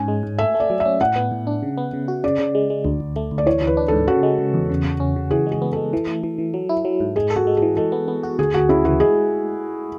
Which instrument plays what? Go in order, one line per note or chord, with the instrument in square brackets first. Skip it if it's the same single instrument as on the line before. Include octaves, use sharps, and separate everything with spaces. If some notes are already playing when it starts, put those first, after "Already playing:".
Already playing: [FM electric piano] G#2 C#4 [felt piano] G#5
[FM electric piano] G#3
G#2
[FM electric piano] A3 [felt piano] E5
[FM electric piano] A3
[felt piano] D5
[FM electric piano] F#3
[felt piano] E5
[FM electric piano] C#4
[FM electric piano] A2 [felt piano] F#5
[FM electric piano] B3
A2
D4
C#3
B3
C#3
F#4
[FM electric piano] C#3 [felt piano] D5
[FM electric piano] C#3
G#3
G#3
D2
D2
A3
D2
[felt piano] D5
[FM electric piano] E3 [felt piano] C#5
[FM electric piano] E3
[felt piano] B4
[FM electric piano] D4
[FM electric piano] G#2 [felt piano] A4
[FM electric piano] C#3 [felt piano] F#4
[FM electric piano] G#3
C#3
E2
C#3
C#3
C#4
C#3
[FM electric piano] E3 [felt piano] G#4
[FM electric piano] G#3
[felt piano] G#4
[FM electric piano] B3
[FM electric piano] G#3 [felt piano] A4
[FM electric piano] E3
A3
E3
E3
F#3
E4
F#3
G#2
[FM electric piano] G#3 [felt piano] G#4
[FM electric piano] A4
[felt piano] F#4
[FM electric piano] G#3
[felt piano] G#4
[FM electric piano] E3
[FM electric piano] G#3 [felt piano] A4
[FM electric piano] B3
B3
F#4
[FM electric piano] D2 [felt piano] G#4
[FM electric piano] D2 [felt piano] F#4
[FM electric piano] C#3 [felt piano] E4
[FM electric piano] E3 [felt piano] F#4
[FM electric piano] G#3 [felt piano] G#4